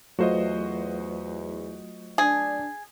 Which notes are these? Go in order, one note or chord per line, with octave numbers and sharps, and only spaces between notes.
E2 F#3 A3 F4 F#4 C5 D#5
D4 G#4